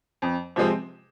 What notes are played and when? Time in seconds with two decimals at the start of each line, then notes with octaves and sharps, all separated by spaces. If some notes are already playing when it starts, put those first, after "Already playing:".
0.22 F2
0.56 C3 F3 G#3 C4